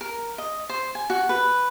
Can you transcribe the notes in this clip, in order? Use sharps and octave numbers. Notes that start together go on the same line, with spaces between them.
A#4
D#5
C5
G#5
F#4
B4